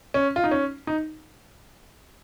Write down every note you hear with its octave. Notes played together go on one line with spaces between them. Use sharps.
C#4
F4
D#4
C#4
D#4